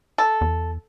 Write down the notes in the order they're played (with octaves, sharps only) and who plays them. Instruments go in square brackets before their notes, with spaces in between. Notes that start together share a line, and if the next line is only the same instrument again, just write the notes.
[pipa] A4
[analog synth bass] E2